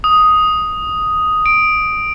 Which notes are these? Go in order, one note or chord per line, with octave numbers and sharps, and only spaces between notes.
D#6
D7